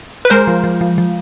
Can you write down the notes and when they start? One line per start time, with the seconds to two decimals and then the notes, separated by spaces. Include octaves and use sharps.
0.25 B4
0.30 G#3 A#4 C5
0.47 F3
0.64 F3
0.81 F3
0.98 F3